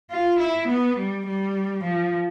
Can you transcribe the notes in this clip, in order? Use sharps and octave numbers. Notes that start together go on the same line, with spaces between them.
F4
E4
B3
G3
G3
F3